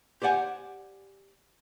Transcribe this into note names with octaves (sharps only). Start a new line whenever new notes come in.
G4 C5 D5 F#5 G#5